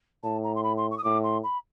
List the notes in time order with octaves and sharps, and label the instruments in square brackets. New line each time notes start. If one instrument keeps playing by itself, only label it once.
[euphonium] A2 [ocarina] A5
[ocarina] A#5
C6
B5
C6
C#6
D#6
[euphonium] A2 [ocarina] D6
[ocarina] C6
B5